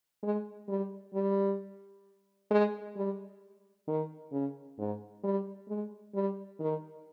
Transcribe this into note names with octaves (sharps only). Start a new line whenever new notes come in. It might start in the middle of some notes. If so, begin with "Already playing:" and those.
G#3
G3
G3
G#3
G3
D#3
C#3
G#2
G3
G#3
G3
D#3